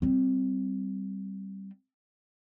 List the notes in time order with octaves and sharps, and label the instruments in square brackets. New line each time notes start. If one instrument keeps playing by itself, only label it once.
[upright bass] G3 C4